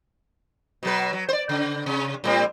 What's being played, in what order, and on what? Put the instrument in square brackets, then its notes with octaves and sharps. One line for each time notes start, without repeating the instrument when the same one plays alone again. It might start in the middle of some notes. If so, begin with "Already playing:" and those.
[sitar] B2 F#3 B4
F#3
C5 D5
C#3
C3
A2 G3 C4